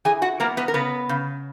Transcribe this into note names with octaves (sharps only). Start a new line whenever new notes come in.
E3 G#4 G#5
F#4 F#5
A#3 B3 A#4
B3 B4
A#4
C#3 B3 B4
C#3